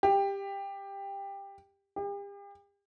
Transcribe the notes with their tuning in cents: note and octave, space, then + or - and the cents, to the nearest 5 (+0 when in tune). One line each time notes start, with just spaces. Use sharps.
G4 +15
G4 +40